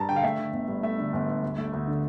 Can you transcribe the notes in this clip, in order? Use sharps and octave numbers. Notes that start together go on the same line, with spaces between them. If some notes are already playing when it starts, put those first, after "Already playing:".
Already playing: G2 A5 A#5
D3 G5
F5
A3 E5
D3
G1
G2
A3 E5
D3
G1
G2
D2
A3
D2
D3